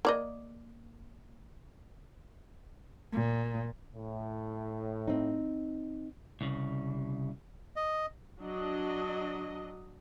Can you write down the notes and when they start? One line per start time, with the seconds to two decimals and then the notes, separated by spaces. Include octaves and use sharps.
0.05 A#3 D5 D#5
3.13 A#2
3.95 A2
5.08 C4 D#4
6.41 C2 C#3
7.76 D#5
8.41 F#3 D4 D#5